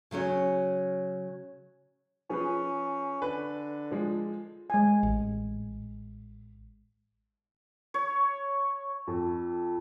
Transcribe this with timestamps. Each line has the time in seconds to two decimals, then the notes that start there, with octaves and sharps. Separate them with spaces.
0.11 C#3 F#3 C#4 C#5
2.30 F3 C#4 G#4 B4
3.22 D3 B4
3.91 F3 G#3
4.70 G#3 G#5
5.03 A1
7.94 C#5
9.07 F2